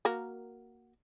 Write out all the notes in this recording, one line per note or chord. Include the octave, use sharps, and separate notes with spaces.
A#3 F#4 A#4